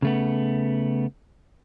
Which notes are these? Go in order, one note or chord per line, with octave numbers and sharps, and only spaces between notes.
C#3 A3 B3